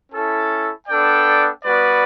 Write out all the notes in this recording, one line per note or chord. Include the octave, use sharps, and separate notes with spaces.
C#4 E4 A4
B3 D4 A4 D5 G5
G3 B3 F#4 B4 D5